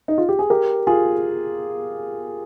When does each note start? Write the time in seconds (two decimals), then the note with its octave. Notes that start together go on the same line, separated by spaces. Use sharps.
0.08 D#4
0.18 F4
0.29 G4
0.39 G#4
0.50 G4 A#4
0.87 F4 G#4